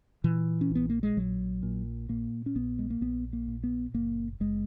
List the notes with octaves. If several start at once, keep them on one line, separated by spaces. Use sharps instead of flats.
A#2 E3
C#4
A#1 B3
A#3
G#3
A#1 F#3
A#2
A#2 A#3
C#4
A#1 B3
G#3
A#3
A#1 B3
A#3
A#2
B3
F#1 A#3
F#1 G#3